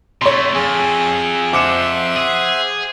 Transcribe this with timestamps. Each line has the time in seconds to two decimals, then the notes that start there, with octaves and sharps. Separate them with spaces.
0.22 C3 A3 C#5 C6
0.54 F2 G#4
1.53 C5 E5 F#5 D6 C#7 E7
2.16 G#4